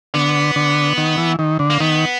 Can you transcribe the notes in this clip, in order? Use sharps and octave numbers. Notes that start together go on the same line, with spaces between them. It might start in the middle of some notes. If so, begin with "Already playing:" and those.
D3 B3
D3
D#3
E3
D#3
D3
A#3
D#3 B3